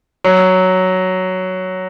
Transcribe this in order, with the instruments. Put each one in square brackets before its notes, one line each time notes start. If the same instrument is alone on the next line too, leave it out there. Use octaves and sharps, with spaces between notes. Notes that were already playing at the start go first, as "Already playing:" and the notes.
[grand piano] F#3